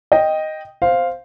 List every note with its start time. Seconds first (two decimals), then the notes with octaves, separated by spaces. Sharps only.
0.12 D#5 G5
0.82 C5 F5